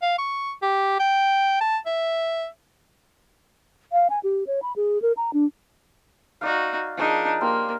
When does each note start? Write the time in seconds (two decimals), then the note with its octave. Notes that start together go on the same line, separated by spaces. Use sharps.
0.02 F5
0.19 C#6
0.62 G4
1.00 G5
1.61 A5
1.86 E5
3.92 F5
4.10 G#5
4.23 G4
4.47 C#5
4.62 B5
4.76 G#4
5.02 A#4
5.17 A#5
5.33 D4
6.41 D#4 F#4 D5 F5
6.97 F3 D4 D#4 G#4 A#4
7.41 A#3 G4 C5 F5